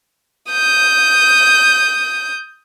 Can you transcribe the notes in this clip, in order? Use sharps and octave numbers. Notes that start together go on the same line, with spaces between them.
D#6 G6